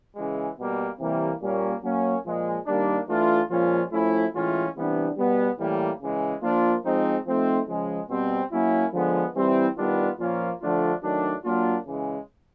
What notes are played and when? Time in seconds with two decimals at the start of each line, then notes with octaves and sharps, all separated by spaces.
0.16 C#3 E3 G#3
0.59 B2 G3 A#3
1.00 C3 E3 G3 A#3
1.42 A#2 G3 A#3 C#4
1.83 F#3 A#3 C#4
2.26 A#2 F3 G#3
2.67 D#3 G3 A#3 D4
3.09 E3 A3 D4 F4
3.50 A#2 F3 G#3 C#4 F4
3.92 F3 A3 C#4 E4
4.34 A2 E3 G#3 C#4 F4
4.76 C3 E3 G3 B3 D4
5.18 B2 G3 B3
5.59 A2 E3 G3 A#3
6.01 C#3 E3 G#3
6.43 F3 A#3 D4 F4
6.85 F3 G#3 C4 D#4
7.26 F3 A3 C4 D#4
7.68 C#3 F3 G#3
8.10 B2 G3 C4
8.52 F#3 A#3 C#4 E4
8.94 D3 F3 G#3 B3
9.35 E3 G3 C4 E4
9.77 D#3 G3 B3 D4 F4
10.19 A#2 F3 A#3 C#4 F4
10.61 D3 F3 A3 D4 F4
11.03 D#3 F#3 A3 D4
11.45 F#3 A#3 D4 F4
11.87 C#3 E3 G#3